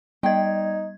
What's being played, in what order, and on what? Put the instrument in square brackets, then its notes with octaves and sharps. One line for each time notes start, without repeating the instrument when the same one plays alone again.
[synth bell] G3 G#6 [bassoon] D#4 [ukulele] D5 G5